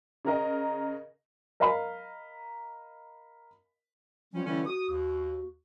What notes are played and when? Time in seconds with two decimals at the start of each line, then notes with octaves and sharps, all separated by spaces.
0.25 C#3 A#4 D#5
1.60 A#4 D#5 F5 A#5 B5
4.33 F3 G3 C#4
4.45 D3 E3 G3 C#4
4.66 F#4 D#6
4.90 D#2